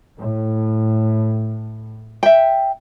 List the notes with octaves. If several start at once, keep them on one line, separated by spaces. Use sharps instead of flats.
A2
E5 G5